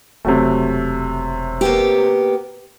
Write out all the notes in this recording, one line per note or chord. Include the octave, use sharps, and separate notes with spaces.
E1 C3 F#3 A3
A#3 B3 G4